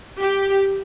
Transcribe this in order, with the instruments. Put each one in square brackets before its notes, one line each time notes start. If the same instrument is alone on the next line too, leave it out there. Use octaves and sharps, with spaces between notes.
[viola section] G4